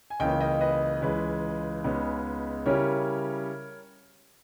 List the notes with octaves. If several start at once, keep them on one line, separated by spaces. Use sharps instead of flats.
G#5
C#2 C#3 E3 A#3 C#4 D#5 G5
D#5 G5
B4 D#5
C#2 C#3 E3 G#3 B4
C#2 C#3 G#3 B3 D#4
C#3 G3 C#4 E4 A#4 C#5